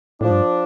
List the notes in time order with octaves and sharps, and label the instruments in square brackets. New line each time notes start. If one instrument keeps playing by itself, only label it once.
[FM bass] A2 [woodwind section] F3 D4
[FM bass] G2